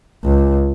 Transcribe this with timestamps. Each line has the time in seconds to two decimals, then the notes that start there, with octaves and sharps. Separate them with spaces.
0.25 C#2